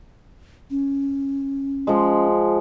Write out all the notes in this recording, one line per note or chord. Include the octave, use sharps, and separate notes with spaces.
C#4
F3 G#3